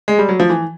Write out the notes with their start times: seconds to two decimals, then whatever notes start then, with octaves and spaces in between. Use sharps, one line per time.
0.08 G#3
0.19 G3
0.29 F#3
0.40 F3
0.50 E3